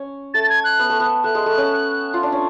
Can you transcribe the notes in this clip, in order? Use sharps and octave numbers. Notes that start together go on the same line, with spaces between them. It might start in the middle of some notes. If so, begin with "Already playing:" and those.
Already playing: C#4
A3 A6
A6
G#6
F#6
B3
A3
B3
A3 F#6
G#3
A3
C#4
F4
D4
C#4